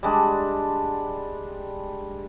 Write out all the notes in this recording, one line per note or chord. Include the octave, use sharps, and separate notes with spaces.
G3 G#3 D4